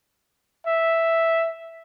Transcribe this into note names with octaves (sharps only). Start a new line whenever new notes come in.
E5